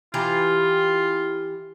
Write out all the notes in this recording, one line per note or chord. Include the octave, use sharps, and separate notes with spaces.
E3 F4 G4 A#5